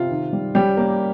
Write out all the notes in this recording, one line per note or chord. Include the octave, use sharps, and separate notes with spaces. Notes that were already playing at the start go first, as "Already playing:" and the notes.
Already playing: C3 F4
D#3
G3
G3 C#4 G4
A#3 C#4 A#4